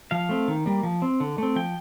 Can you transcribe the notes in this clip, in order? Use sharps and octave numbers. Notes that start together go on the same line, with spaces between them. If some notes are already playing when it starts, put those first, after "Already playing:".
F3 F5
A3 C4
D#3
G3 A#3
F3
C4
D3
A3 C4
F3 G5